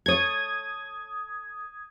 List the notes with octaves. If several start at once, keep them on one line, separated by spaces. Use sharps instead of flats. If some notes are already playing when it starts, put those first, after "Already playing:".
A4 C#5 D#6 G#6